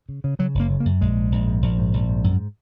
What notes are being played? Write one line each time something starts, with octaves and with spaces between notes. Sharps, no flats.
C#3
C#3
C#3 F#3
F#1
A#3
C#3
A#3
F#2
A#1 G#3
G#2
A#1
G#2
A#1
G#2
A#1
G#2
F#2